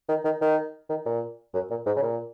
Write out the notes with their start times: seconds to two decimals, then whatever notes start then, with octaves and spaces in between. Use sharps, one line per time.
0.09 D#3
0.25 D#3
0.42 D#3
0.90 D#3
1.06 A#2
1.54 F#2
1.70 A#2
1.86 G#2
1.97 C#3
2.03 A#2